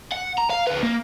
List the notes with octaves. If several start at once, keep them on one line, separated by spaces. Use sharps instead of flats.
F#5
A#5
F5
D2 B4
A#3